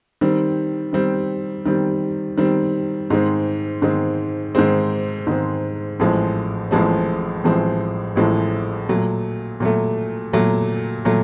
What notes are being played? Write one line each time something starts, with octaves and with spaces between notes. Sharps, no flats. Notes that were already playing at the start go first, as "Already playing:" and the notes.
D#3 G3 C4
D#3 G3 C4
D#3 G3 C4
D#3 G3 C4
G#2 D#3 G#3 C4
G#2 D#3 G#3 C4
G#2 D#3 G#3 C4
G#2 D#3 G#3 C4
A1 A2 F3 G#3 C4
A1 A2 F3 G#3 C4
A1 A2 F3 G#3 C4
A1 A2 F3 G#3 C4
A#2 F#3 A3
A#2 F#3 A3
A#2 F#3 A3
A#2 F#3 A3